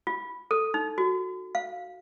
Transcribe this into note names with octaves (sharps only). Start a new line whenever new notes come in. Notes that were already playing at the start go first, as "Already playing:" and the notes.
F4
A4
D#4
F#4
F5